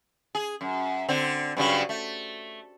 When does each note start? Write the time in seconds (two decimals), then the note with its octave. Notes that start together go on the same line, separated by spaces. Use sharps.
0.35 G#4
0.61 F#2
1.08 D3 C4
1.57 G2 C#3 F#3
1.89 A3